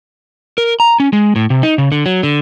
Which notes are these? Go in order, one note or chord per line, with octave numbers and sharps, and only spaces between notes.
A#4
A#5
C#4
G#3
A2
C3
D#4
C#3
D3
F#3
D3